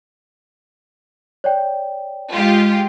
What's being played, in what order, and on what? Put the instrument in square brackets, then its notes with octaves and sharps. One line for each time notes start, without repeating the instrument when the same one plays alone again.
[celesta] C#5 D5 G5
[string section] G#3 F4 G4